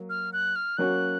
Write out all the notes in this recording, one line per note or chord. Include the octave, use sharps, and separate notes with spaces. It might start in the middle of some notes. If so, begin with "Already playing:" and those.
Already playing: F#3 A#3
F6
F#6
F6
F#3 A#3 C#4 F#4 F#6